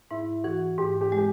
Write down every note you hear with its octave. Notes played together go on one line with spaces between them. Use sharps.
G#2 E4
E3 F#4
G#2 G4
G4
G#3
G4